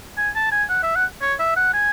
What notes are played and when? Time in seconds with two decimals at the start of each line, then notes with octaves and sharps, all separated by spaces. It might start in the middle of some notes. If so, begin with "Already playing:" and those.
0.18 G#5
0.35 A5
0.52 G#5
0.70 F#5
0.83 E5
0.96 F#5
1.22 C#5
1.39 E5
1.57 F#5
1.74 G#5